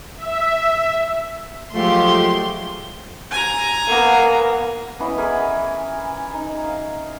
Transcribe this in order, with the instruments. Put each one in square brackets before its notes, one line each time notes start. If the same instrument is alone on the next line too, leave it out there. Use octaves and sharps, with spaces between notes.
[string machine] E5
[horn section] F3 A3 [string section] F#3 G#3 G4 [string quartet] C6
[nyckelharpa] G#5 A#5
[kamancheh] A#3 B3
[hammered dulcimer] E3 B3 C#4 D#5
E3 G#4 A#4 B5
D#4
F5